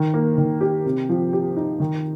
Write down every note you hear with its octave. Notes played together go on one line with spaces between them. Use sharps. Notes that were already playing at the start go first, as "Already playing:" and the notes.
Already playing: D#3
A#3
D#3
G4
C3
F3
G4
D#4
D#3